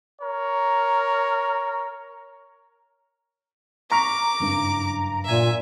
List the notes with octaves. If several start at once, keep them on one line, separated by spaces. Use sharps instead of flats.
A#4 C#5
A#5 C#6 D6 F6 B6
F#1 G2
A#2 E5 G#5